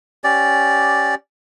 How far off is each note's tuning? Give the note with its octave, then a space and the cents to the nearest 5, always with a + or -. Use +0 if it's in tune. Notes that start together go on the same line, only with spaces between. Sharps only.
C#4 -5 G4 -10 D5 -5